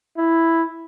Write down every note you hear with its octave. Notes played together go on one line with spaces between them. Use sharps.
E4